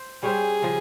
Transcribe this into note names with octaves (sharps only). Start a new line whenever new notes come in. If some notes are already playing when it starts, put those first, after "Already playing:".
Already playing: C5
G3 C#4 G4 G#4 C5
C#3 F3